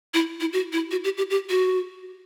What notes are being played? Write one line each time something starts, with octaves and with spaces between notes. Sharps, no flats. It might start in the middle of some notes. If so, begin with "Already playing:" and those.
E4
E4
F#4
E4
F#4
G4
G4
G4
F#4